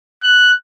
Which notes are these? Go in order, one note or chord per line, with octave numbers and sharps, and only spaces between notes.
F#6